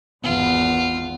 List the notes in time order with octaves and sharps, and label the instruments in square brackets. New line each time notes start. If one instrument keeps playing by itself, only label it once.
[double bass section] G#1 E2 [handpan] B3 [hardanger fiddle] F4